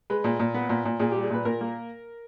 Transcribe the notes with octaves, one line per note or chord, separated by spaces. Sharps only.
G#3 B4
A#2
A#2
B3
A#2
A#2
A#2 G#4
G3 G4
G#4
A#2 B4
A#2 A#4
A#3